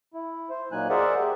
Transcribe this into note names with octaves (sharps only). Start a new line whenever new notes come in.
E4
C5
A#2 F#3 A#3 D#4 G#5 F#6
G#4 A#4 C5 D5 E5 F#5
G4